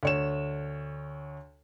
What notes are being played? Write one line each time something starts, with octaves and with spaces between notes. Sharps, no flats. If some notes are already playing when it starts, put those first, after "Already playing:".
D2 C#5 E7